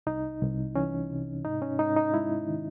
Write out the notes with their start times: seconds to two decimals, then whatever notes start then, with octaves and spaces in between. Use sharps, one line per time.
0.07 C2 D#4
0.42 C2
0.75 E3 C#4
1.10 C3
1.45 G#2 D#4
1.62 C#4
1.79 G#2 D#4
1.96 D#4
2.13 G#3 E4
2.48 D#3